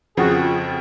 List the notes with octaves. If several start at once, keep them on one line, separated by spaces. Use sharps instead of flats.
F2 C#3 F3 F#4 G#4